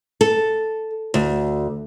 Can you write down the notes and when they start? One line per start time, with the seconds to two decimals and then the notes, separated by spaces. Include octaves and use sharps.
0.21 A4
1.14 D2